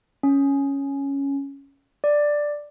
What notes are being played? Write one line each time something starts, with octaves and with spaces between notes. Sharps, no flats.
C#4
D5